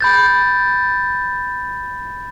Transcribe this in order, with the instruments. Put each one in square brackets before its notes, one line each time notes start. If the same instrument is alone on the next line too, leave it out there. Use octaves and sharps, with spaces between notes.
[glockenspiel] B5 G6 A6